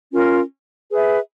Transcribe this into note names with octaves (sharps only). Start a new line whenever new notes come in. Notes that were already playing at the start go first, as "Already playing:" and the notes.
C#4 F4 A#4
G#4 B4 E5